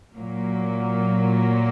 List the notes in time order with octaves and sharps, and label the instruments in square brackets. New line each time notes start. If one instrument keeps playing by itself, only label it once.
[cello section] A#2 F#3 A#3